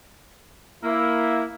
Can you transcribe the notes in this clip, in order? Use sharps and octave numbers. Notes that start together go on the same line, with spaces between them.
A#3 E4